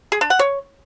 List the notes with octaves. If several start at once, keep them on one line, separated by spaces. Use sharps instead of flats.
G#4
D4
F#5
C#5